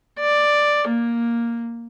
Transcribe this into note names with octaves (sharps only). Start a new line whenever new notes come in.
D5
A#3